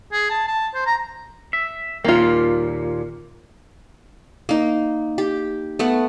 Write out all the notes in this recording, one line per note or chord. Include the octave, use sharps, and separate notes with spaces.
G#4
A5
A5
C5
A#5
E5
D#2 A#2 A#3 F4
A#3 D#4
G4
A3 B3 F#5